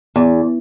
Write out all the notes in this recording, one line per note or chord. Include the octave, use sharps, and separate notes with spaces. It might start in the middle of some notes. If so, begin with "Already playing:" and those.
E2